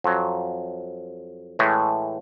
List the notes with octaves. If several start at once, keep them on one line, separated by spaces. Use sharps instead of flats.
F2 F#3
A2 E3 G#3 A3